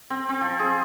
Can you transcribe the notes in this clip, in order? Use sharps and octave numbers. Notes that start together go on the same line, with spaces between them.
C4
C4
F3
G#4